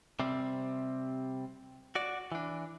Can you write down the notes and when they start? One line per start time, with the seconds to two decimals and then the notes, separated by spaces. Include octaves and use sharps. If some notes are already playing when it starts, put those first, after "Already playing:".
0.20 C3 G3 C4
1.95 F#4 D5
2.32 E3 D4